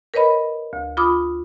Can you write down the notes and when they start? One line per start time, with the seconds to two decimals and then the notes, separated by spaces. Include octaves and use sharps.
0.14 A#4 B4 C#5 D#5 B5
0.73 D2
0.97 F4 B5 D6 D#6